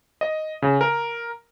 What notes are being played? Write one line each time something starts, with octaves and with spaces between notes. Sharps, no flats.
D#5
C#3
A#4